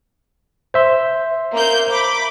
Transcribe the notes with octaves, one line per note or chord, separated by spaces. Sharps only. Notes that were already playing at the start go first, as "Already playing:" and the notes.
C5 E5 C6
A#3 G6
B5 D6